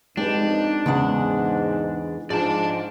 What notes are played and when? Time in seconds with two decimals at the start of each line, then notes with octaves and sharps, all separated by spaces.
0.17 F2 G#3 C4 D4 D#4 G4 B4
0.86 E2 G#2 C#3 G#3 F#5
2.30 G#2 F3 D4 G#4 D5 A5